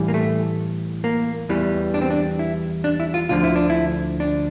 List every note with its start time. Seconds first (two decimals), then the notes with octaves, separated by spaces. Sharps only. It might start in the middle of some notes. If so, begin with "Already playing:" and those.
Already playing: A2 E3 G3
0.08 A#3
0.14 A3
1.04 A#3
1.49 E2 E3 G3
1.94 D4
2.02 C4
2.10 D4
2.39 E4
2.84 D4
3.00 E4
3.14 F4
3.29 D2 D3 F3 F4
3.44 E4
3.56 D4
3.70 E4
4.20 D4